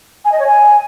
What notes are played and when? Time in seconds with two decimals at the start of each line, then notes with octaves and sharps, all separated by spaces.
0.25 G#5
0.32 D#5
0.39 C#5
0.47 G#5